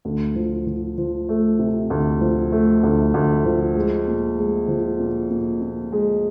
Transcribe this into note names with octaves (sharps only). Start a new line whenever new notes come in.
D2
F3
F3
F3
A3
C3
D2
F3
A3
D2
D2
F3
G#3
A#2
G#3
F3
A#2
A#2
A#2
G#3